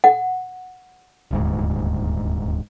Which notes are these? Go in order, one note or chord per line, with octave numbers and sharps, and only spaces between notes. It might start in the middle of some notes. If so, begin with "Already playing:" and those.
F#5
D#1 D2 G#2